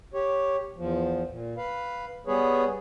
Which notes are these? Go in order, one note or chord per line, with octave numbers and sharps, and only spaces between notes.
G4 C#5
E2 F3
A#2
B4 F5
G3 B3 G#4 B4 C#5